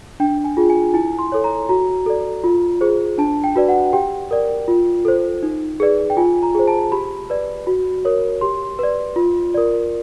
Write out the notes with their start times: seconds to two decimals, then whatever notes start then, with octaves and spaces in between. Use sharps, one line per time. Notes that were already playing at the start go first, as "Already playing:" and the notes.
0.20 D4 G5
0.44 G#5
0.57 F4 G#4
0.70 G#5
0.94 E4 G#5
1.19 C6
1.32 A4 C#5
1.44 A#5
1.69 F#4 A#5
2.06 A4 D5
2.44 F4
2.81 G#4 C5
3.18 D4 A5
3.44 G5
3.56 F#4 B4 D5
3.69 F#5
3.93 G4 G5
4.31 A#4 D5
4.68 F4
5.05 A4 C5
5.43 D#4
5.80 G#4 B4 D5
6.10 G5
6.17 F4 G#5
6.43 A#5
6.55 G#4 C5
6.68 A5
6.92 G4 B5
7.30 B4 D5
7.67 F#4
8.05 A#4 C#5
8.41 G4 C6
8.79 B4 D5
9.16 F4
9.54 A#4 D5